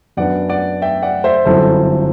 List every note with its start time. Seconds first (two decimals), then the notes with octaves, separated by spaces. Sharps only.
0.17 F#2 F#3 B3 D4 D5 F#5
0.49 D5 F#5
0.82 E5 G5
1.03 D5 F#5
1.24 C5 E5
1.46 G1 F#2 F#3 C4 E4 A4 C5